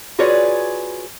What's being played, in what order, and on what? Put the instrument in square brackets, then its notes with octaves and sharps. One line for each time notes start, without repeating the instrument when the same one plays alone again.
[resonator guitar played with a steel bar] F4 F#4 G#4 B4 C#5 D5